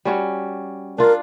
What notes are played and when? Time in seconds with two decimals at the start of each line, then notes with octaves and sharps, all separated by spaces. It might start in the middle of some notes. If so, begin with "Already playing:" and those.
0.05 G3 C#4 F#4
0.98 D4 F4 A#4